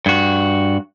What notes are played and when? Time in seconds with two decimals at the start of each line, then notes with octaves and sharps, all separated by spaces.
0.06 G2 F#4